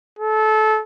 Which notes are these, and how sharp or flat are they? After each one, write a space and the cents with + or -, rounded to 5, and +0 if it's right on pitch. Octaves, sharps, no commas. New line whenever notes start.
A4 -25